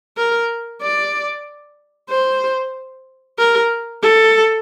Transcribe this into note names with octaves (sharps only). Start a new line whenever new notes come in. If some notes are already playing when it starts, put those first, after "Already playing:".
A#4
D5
C5
A#4
A4